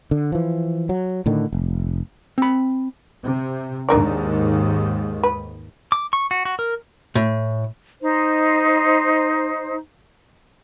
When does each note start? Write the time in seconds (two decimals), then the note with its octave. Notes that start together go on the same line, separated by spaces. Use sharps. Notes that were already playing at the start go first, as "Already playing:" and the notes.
0.11 D3
0.32 E3 F3
0.89 F#3
1.26 A2 D3 D#3
1.53 F1
2.38 C4 B5
3.22 C3
3.89 D#2 G#2 D#3 D4 A#4 D5
5.23 B4
5.92 D6
6.13 C#6
6.31 F#4
6.45 F#4
6.59 A#4
7.15 A2
8.02 D#4 C5